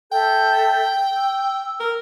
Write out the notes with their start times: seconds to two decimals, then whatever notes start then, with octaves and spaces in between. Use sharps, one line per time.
0.12 A4 E5 G5 G6
1.15 E6
1.80 A#4